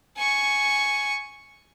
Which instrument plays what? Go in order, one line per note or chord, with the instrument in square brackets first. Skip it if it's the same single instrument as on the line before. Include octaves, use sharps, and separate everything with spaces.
[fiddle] G#5 C#6